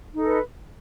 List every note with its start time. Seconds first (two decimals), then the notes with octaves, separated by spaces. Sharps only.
0.14 D#4
0.18 A4
0.21 D#5
0.25 B4